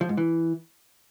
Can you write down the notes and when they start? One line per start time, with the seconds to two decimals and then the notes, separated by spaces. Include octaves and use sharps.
0.01 F3
0.09 G#2
0.17 E3